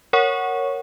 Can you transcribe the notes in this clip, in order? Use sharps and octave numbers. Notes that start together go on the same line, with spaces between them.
A#4 C#5 F#5 C#6